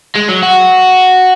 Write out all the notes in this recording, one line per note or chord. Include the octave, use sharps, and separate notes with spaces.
G#3
F#3
F#4